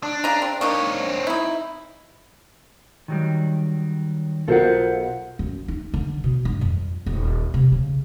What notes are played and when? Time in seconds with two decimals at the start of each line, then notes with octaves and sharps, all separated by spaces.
0.03 D4
0.24 C#3 A#5
0.42 C4
0.61 A#3 C4 D4 D#4 C#5
1.27 D#4 E4
3.08 D#3 F#3 G3
4.48 B1 F4 A4 A#4 C5 F#5
5.39 F#2
5.68 D#4
5.94 D3
6.24 B2
6.45 G2
6.61 F2
7.06 D#1
7.54 C3
7.72 C#3